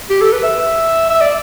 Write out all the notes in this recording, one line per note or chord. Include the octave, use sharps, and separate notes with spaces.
G4
A4
B4
E5
E5
D5